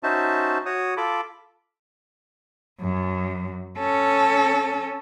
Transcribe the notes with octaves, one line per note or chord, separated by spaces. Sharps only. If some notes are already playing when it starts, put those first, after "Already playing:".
C#4 D#4 F#4 C5 E5 A5
F#4 C#5 D#6
F4 A4 B5 D6
F#2
C#4 A4